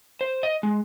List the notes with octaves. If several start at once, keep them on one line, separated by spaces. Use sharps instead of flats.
C5
D#5
G#3